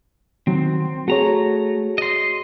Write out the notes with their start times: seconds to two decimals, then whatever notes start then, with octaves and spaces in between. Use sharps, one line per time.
0.47 D#3 F#3 C4
1.08 A3 F#4 G#4 C#5 A#5
1.98 D#5 C6